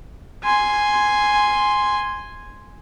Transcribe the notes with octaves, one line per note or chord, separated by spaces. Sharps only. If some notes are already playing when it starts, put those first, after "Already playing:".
G#5 C6